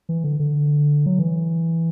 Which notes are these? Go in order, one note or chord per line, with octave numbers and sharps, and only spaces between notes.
E3
D3
D3
F#3
E3